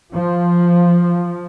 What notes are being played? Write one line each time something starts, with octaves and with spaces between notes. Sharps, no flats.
F3